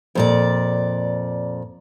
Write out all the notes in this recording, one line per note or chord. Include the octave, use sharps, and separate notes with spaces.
F2 A#2 D5